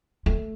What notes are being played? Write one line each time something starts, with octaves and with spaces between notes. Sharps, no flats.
A3